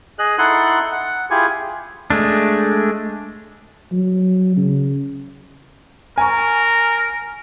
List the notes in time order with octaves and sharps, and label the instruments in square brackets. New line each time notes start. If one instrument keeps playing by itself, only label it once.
[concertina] G#4 D#5 F#6
D#4 E4 A4 F#5 C6 F#6
F#5
E4 F4 G4 G#4 G#5
[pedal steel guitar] G#3 A3 D4
[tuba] F#3
C#3
[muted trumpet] A#4 [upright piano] G#5 A#5 C#6